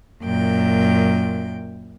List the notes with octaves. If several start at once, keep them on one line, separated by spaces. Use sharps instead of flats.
F#2 A#2 G5